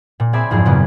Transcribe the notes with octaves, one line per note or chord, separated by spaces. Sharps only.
A#2
C4 G#4 D5 E5 G#5 B5
F#1 F2 G#2 G#4
F#2 A#2 C#3 A#3 B3